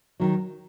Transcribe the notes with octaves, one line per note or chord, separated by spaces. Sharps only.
D#3 F#3